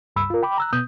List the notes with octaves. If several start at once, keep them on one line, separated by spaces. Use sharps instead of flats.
C#2 G2 B5 E6
F4 A#4
G5 B5 D6
A#5 E6 F#6
B2 B3 D#6 G6